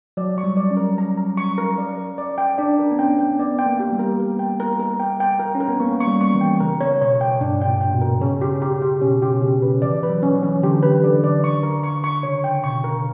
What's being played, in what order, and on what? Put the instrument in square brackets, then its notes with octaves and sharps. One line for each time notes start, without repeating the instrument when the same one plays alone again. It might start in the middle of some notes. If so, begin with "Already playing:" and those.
[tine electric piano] F#3 [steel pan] D5
[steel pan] C#6
[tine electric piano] G3
[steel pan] D5
[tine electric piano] C#4
[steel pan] A#4
A#5
A#5
C#6
A#4
D5
A#4
D5
G5
[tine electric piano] D4 [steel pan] D5
[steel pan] A#4
[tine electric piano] B3
[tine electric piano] C#4 [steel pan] G5
[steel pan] G5
[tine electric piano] B3 [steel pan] D5
[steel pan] G5
[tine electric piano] A#3
[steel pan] G4
[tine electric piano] G3
[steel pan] A#4
A#4
G5
A#4
A#4
G5
G5
A#4
[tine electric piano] C#4
[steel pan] A#4
[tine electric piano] B3
[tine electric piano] A#3 [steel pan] C#6
[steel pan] C#6
[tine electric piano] G3
[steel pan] C#6
[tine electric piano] E3
[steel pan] G5
[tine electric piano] C#3 [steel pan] A#4
[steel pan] C#5
[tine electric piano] B2 [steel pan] C#5
[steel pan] G5
[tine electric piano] G2 [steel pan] D4
[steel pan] G5
[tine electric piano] A#2
[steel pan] G5
[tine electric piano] B2
[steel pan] A#4
[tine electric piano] C#3 [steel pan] C#4
[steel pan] G4
G4
G4
[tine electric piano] B2 [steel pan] C#4
[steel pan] G4
[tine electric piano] B2
[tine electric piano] C#3 [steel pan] C#4
[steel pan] B4
[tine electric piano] E3 [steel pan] D5
[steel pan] B4
[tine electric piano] F#3
[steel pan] C#4
[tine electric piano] E3
[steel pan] C#4
[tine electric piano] D3 [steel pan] G4
[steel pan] B4
[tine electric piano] D3 [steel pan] D5
[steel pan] D5
C#6
A#4
C#6
C#6
[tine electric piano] C#3 [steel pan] C#5
[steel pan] G5
[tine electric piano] B2 [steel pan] C#6
[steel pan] A#4